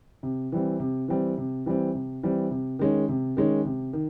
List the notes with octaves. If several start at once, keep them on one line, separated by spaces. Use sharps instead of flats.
C3
E3 G3 C4
C3
E3 G3 C4
C3
E3 G3 C4
C3
E3 G3 C4
C3
D#3 G#3 C#4
C3
D#3 G#3 C#4
C3
D#3